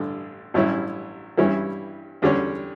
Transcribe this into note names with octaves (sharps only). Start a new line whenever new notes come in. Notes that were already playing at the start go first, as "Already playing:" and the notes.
Already playing: A1 G2 D3
A1 G2 F#3 C#4 E4
G2 E3 G3 C#4 E4
E2 D3 G3 C#4